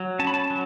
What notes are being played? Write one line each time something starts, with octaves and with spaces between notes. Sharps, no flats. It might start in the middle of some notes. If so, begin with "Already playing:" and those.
Already playing: F#3
C#4 A5
B5
A5
F#3